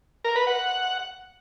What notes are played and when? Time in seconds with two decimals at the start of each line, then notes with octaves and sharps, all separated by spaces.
0.25 A#4
0.36 B4
0.47 F#5